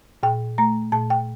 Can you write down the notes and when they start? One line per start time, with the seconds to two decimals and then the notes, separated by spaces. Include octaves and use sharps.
0.23 A#2 G5
0.58 A3 A#5
0.92 A#2 A5
1.10 G5